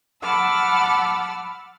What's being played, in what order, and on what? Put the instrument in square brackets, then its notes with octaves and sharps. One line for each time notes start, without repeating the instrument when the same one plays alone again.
[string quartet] F#5 A5 B5 D6 E6 F6